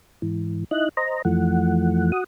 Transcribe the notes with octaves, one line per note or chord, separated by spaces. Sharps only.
G#2 E3
D#4 E4 D#5 F#6
C5 D#5 A#5
F2 E3 F3 A3 F#5
F#4 F#5 D#6